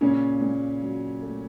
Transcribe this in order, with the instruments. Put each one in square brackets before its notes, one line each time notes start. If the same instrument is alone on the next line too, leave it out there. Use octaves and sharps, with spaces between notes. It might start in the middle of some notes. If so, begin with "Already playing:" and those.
[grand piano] A#2 C#3 C#4
A#2
F#3
A3